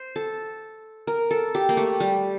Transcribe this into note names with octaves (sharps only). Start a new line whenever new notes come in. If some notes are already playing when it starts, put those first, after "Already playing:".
Already playing: C5
A4
A#4
A4
G4
A#3
A3
G3